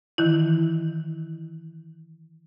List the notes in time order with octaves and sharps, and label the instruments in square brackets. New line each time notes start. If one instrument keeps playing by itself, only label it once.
[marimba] D#3 E3 E4